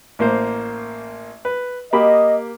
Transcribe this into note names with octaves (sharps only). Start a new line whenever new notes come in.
A1 A#3 C5
B4
A#3 G4 D#5 B5